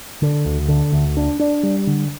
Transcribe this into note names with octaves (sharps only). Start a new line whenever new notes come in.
D3
D2
D3
D2
D4
D4
G3
D3